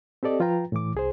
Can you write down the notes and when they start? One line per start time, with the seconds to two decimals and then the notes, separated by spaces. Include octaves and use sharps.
0.23 C4 G4 A4 D5 D#5
0.40 F3 F4 B4 G5 A#5
0.72 A2 E3 D6
0.94 C2 G#4 C5